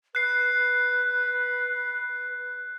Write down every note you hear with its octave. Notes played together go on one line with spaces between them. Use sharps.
B4 F#6 C7